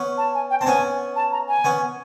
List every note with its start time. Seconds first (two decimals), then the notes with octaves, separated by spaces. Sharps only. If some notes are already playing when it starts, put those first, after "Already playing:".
Already playing: B3 C#4
0.18 A5
0.34 G#5
0.50 G5
0.61 C4 A5
0.66 B3 C#4 G#5
1.16 A5
1.32 A#5
1.48 G#5
1.64 B3 C#4